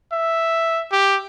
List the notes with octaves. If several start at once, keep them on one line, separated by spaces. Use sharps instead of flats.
E5
G4